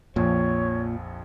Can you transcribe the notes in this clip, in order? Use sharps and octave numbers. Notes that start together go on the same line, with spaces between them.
A#1 F2 A#2 C#5